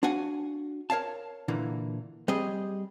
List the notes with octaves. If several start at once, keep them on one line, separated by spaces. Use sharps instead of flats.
D4 F#4 F5 F#5 G#5
A#4 C#5 F5 A5
A#2 D3 E3 A#3
G3 C4 G4 G#4 D#5